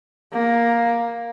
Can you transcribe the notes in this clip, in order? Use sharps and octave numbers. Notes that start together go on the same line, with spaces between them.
A#3